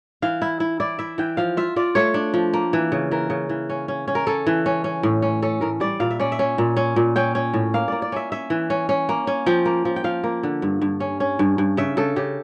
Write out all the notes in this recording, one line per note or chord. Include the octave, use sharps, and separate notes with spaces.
E3 F5
E4
E4
E4 D5
E4 E5
E3 G5
F3 F5
F4 E5
F4 D5
A3 C#5
D4
F3
A#3
E3
C#3
E3 A#4
C#3
E3
C#4
C#4
C#4
A#4
C#4 A4
E3
C#4
C#4
A2
C#4
C#4 A4
A2 A#4
G3 D5
A#2 F5
E5
C#4 D5
E5
C#4
A#2
C#4
A#2
C#4 G5
C#4
A2
A#3 F5
A#3 D5
D5
C#4 E5
C#4 E5
E3
C#4
C#4
A#3
C#4
F3 G5
A#3
F3
G5
F3 F5
A#3
D3
G2
G2
C#4
C#4
G2
G2
C#3 E5
C#3 A4
C#3 G4